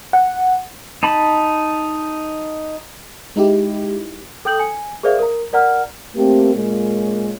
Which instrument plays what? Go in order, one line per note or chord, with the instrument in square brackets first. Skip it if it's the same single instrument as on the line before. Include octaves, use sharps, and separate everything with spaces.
[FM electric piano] F#5
[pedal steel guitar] D#4 A5 B5
[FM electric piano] G#3 D#4 E4 G4
[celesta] A4 G5 D#6 G6 F#7
G#5
G#4 A#4 C5 D5 E5 F5
A#4 A#5
A#4 D5 F#5 A#5 F6
[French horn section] A3 A#3 C4 G4
A#2 G#3 A#3 C#4 F4